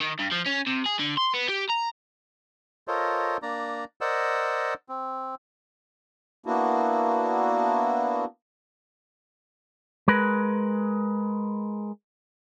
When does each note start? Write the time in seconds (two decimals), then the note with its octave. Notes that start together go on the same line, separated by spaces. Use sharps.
0.01 D#3
0.19 G2
0.32 F3
0.46 C#4
0.67 C3
0.86 G#4
0.99 D3
1.17 C6
1.34 B3
1.48 G4
1.69 A#5
2.88 F4 A4 A#4 C5 C#5 D#5
3.42 A#3 D4 D5 A#5
4.01 A#4 C5 D5 D#5 F#5 E6
4.89 C4
6.46 A#3 B3 D4 E4 F#4
10.08 G#3 A#4 B4